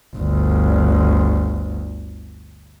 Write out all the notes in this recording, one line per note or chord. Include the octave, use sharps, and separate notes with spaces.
G1 D2